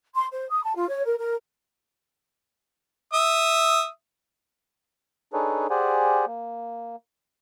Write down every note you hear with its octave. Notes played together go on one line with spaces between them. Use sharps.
C6
C5
D#6
A5
F4
C#5
A#4
A#4
E5 D#6
D4 D#4 G#4 A4 B4 C#5
G4 G#4 C5 D5 F#5 G#5
A#3